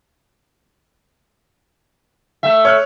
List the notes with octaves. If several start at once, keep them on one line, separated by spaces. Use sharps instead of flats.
A3 E5
C#5 F6 F#6